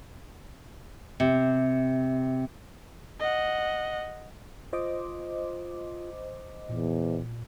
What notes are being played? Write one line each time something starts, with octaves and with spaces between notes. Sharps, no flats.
C3
D#5 F#5
F4 C5 D#5 D6
E2 A#2